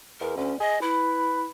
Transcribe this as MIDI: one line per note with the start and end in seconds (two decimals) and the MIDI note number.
0.21 0.34 40
0.21 0.35 70
0.37 0.53 38
0.37 0.56 61
0.60 0.76 68
0.60 0.79 75
0.82 1.45 64
0.82 1.50 71